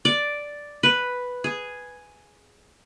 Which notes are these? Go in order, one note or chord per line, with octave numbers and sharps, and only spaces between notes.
D5
B4
G#4